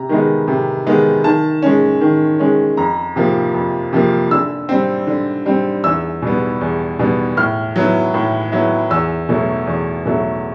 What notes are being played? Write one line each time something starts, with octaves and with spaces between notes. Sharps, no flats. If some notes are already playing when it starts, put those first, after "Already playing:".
Already playing: C3 A#5
D#3 G#3 B3 D#4
C3
D#3 G#3 B3 D#4
D#3 A5
G#3 C#4
D#3
G#3 C#4
F2 A#5
C3 F3 A#3
F2
C3 F3 A#3
D3 E6
G3 C4
D3
G3 C4
E2 E6
B2 G3 B3
E2
B2 G3 B3
A2 F6
F#3 B3 E4
A2
F#3 B3 E4
E2 E6
B2 F#3 A3
E2
B2 F#3 A3